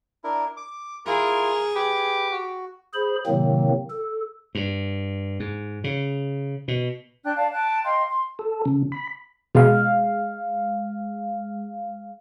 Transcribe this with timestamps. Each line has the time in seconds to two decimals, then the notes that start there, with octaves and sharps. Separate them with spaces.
0.24 D4 E4 A#4
0.57 D6
1.06 E4 F4 G#4 A#4
1.75 G4 B4
2.31 F#4
2.94 G#4 C5 B5
3.27 A2 C3 D#3 F#3 A#3 C4
3.90 A4
4.55 G2
5.40 G#2
5.84 C#3
6.68 B2
7.24 D4 G5 F#6
7.36 D5 F5 A5
7.52 G5 A5 F#6
7.84 D#5 F5 G5 C6
8.08 C6
8.39 A4
8.65 C#3
8.92 B5
9.55 B2 G#3 F4 F5